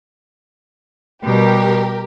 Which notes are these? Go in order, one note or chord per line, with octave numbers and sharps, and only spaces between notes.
B2 G3 G4 A#4